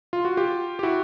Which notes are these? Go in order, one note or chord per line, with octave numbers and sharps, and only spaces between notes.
F4
F#4
F4 G4
G4
E4 F#4